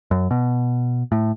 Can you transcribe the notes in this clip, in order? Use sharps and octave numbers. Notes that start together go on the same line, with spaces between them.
F#2
B2
A2